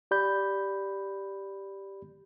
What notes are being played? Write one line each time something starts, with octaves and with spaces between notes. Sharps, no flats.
G4 D5 B5 G6